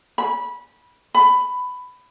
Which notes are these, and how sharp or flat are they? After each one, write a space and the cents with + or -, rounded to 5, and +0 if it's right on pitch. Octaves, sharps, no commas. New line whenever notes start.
B5 -20
B5 +15